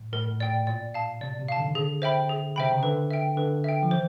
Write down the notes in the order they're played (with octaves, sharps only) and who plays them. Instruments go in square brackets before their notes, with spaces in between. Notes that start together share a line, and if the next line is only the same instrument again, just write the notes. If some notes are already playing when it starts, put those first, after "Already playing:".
Already playing: [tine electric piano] A2
[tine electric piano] A2 [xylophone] A#4
[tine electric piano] A#2
[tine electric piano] A2 [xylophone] D5 G5
[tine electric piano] A#2 [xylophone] D5
[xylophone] F5 A5
[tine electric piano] C3 [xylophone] D5
[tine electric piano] C3
[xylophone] F5 A5
[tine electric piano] D3
D#3
[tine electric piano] D3 [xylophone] G#4
[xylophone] C5 E5 G5 B5
G#4
[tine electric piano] C3 [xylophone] C5 E5 G5 B5
[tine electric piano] C#3
[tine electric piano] D3 [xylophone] B4
[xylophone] E5 G5
[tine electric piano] D3 [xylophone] B4
[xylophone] E5 G5
[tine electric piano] F3
[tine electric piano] E3 [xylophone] C5